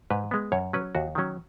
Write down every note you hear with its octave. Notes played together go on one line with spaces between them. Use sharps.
G#2 B4
G#3 B3
F#2 C#5
F#3 C#4 B4
D#2 F#4
D#3 F#3 C#4